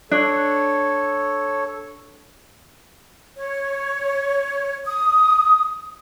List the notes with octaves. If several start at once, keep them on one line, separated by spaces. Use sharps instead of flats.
D4 A4 C#5
C#5
D#6